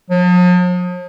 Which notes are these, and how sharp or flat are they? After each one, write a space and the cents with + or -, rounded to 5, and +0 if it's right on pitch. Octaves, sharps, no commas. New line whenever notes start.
F3 +45